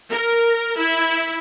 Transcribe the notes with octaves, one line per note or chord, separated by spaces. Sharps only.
A#4
E4